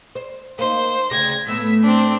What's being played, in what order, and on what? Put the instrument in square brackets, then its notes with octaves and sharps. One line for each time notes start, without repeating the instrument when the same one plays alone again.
[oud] C5
[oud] A#3 D#4 [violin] C5
[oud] D2 C#3 G4 [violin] G#6 A#6
[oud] A2 A3 B3 [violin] E6 B6
[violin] C4 D4